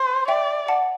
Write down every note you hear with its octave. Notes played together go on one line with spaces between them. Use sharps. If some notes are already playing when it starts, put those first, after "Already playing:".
Already playing: C5
D5 E5 G5
F#5 A5